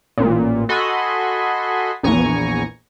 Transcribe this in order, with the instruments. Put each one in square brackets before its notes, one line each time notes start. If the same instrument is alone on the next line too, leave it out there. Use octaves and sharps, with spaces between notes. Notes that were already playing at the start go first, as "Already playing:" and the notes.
[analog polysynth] A1 A#2
F#4 A4 D#5 G#5 B5 C6
A#1 E2 G#5 A#5 C#6